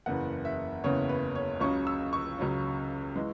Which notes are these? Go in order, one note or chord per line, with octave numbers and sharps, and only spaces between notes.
F#1 E2 C#3 E3 B3 F#5
E5
F#1 E2 C#3 E3 B3 C#5
B4
C#5
C#2 C#3 F#3 C#4 C#6
E6
C#6
C#2 C#3 F#3 C#4
E3 G#3